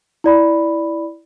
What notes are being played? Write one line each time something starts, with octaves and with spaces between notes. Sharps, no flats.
E4 D5 B5